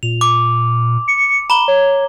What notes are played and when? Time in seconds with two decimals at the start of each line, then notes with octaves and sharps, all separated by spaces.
0.03 A#2 F7
0.21 D6
1.08 C#7
1.50 A#5 B5 G7
1.68 C#5